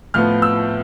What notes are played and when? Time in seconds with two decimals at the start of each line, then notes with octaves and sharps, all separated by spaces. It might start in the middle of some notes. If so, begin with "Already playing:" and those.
0.14 A2 F3 B3 F6
0.42 E6